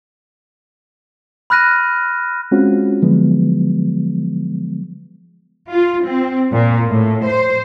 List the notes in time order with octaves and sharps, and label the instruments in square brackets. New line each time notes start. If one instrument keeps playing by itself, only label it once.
[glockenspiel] B5 F6 F#6 A#6 D#7
[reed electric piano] G#3 C4 C#4 F4 F#4
D3 F3 F#3 G#3 B3
[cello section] F4
C4
A#2
A2
C5